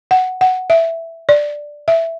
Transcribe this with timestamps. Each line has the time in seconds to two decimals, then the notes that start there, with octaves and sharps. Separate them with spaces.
0.11 F#5
0.41 F#5
0.70 E5
1.29 D5
1.88 E5